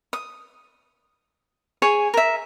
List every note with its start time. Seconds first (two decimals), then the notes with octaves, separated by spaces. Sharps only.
0.13 D#6
1.82 G#4 C#5 G#5 C#6
2.14 A#4 E5